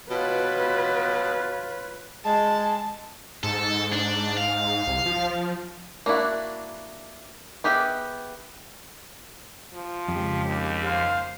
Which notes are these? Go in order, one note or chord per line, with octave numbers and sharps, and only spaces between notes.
B2 F4 B4 C#5
G#3 A5
G#2 A4
D4
F5
C2
F3
A#3 D4 E4 F#4
B3 G4 G#4 E5 G5
F3
F2 C#3 G#3 G4
D#2
C5 F5